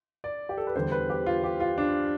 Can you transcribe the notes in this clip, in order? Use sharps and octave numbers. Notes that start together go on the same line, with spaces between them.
D5
G4
A4
B4
E2 D3 G3 C5
B4
G4
F4
G4
F4
D4